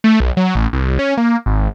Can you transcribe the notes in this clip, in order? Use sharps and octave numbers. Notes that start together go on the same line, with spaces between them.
A3
B1
F#3
A1
C2
C#4
A#3
G#1